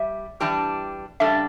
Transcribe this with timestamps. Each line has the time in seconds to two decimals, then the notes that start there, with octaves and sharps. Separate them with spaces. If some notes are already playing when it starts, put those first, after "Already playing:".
Already playing: G3 E5
0.40 E3 G3 D4 G4
1.20 C#3 G3 D4 A4 E5